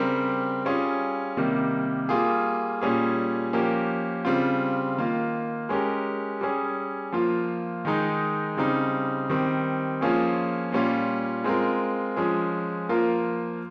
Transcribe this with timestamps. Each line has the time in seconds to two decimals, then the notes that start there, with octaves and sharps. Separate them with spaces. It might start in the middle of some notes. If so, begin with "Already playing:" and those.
Already playing: C#3 G3 C4 G4 A#4
0.65 G3 C#4 F4 G#4
1.37 C3 D#3 G3 A#3
2.09 G3 A#3 F4 G#4
2.82 A#2 G3 C#4 G#4
3.53 F3 A#3 C#4 G4 A#4
4.25 C#3 G3 C4 F4
4.97 D#3 A#3 F4
5.69 G#3 C#4 G4 A#4
6.41 G3 C#4 G#4
7.12 F3 A#3 F4
7.85 D#3 G#3 D#4
8.57 C#3 G3 C4 D#4
9.29 D#3 G3 C4
10.01 F3 A#3 C#4 F4 G#4
10.72 A#2 G3 C#4 F4
11.44 G#3 C4 F4 A#4
12.16 F3 G#3 C#4 G#4
12.89 F3 A#3 F4 A#4